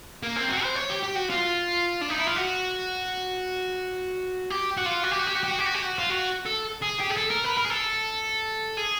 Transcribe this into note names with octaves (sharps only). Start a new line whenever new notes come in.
A#3
C4
F#4
C5
C#5
G4
G4
F#4
F4
D4
D#4
E4
F4
F#4
G4
F#4
F4
F#4
G4
F#4
G4
F#4
G4
F#4
G4
F#4
G4
F#4
F4
F#4
A4
G#4
G4
G#4
A4
A#4
B4
A#4
G#4
A4
G#4